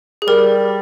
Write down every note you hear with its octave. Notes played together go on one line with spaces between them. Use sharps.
G#4
G3 A#4